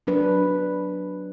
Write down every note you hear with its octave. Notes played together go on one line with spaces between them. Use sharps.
F#3 D4 B4